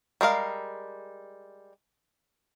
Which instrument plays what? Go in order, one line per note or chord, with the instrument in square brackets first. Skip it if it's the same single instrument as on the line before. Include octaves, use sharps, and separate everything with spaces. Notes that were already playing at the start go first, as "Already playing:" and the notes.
[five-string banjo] G3 G#3 A#4 F5